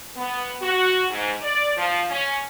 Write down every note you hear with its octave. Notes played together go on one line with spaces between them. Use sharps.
B3
F#4
G#2
D5
F3
C#4